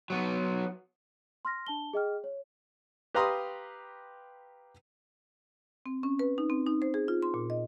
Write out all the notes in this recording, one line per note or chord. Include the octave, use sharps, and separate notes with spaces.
F#3 B3
C6 F6 A#6
D4 A5 G7
G#4 D#5 G5 F6
C#5
G4 B4 F5 A#5 C6 D#6
C4
C#4
B4
D#4
C4
D#4
C5
G#4
F4
C6
A#2
D#5